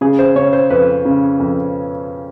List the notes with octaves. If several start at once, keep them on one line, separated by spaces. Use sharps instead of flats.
C#3 G#4
C5
C#3 C#5
C5
F2 B4
C#3
F2